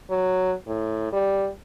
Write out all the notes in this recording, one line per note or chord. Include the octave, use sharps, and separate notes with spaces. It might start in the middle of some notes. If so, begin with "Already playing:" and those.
F#3
A2
G3